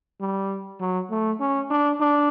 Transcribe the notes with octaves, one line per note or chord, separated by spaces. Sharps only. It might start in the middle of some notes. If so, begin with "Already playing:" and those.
G3
F#3
A3
C#4
D4
D4